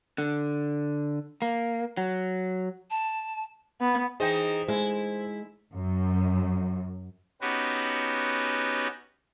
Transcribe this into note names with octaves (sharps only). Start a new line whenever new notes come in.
D3
A#3
F#3
A5
B3
E3 D#4 G#4 C5 G5
G#3 E4 C5
F#2
B3 C#4 D#4 F#4 G4 B4